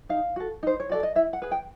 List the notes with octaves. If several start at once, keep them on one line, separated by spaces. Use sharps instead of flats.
D#4 F5
F#4 A4
D#4 C5
C#5
F#4 A4 D5
D#5
E4 E5
F#5
G#4 B4
G5